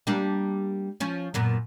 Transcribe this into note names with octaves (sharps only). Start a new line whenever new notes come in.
G3 A#3 D4
F3 C#4
F#2 A#2 B3